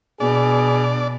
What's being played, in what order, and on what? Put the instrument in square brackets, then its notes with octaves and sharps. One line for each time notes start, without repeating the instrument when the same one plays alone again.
[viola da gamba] B2 [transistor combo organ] D4 D5 [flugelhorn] G#4